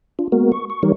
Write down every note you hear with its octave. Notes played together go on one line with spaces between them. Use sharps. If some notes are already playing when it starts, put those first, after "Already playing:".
D4 F4
G#3 A#3 B3 F#4 A#4
C#6
C#6
E3 G3 D#4 G4 A#4 C#5